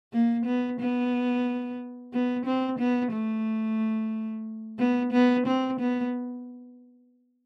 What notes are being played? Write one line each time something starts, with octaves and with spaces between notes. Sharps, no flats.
A#3
B3
B3
B3
C4
B3
A3
B3
B3
C4
B3